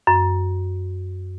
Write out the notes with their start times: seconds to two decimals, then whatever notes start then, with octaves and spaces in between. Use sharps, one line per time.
0.07 F#2